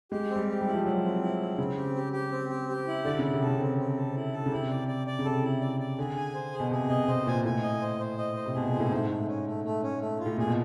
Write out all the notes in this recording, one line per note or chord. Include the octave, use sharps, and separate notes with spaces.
G#3 G4
C4
G3
G4
G3
E4
F3
F#3 E4
C4
E4
C4
C#3 C4
G4
G4
G4
C4
G4
G4
E4
D3 D5
C#3 E4
C3
C#3 A4
C4
C4
A4
E4
A4
C#3
C3 E4
D5
D5
D5
C#3
C3 A4
E4
D5
D5
D3 G#4
G#5
C5
G#4
B2
C3 G#4
B2 D#5
B2 C5
A#2 G#5
A2 G#5
D#5
C5
C5
D#5
C5
C3
B2 G#4
A#2 C5
A2
G#2 A3
A3
C#4
A3
A3
C#4
A3
F4
A2
A#2 G#4
B2